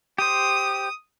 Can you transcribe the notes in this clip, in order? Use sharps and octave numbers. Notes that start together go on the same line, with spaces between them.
G4 C5 D#6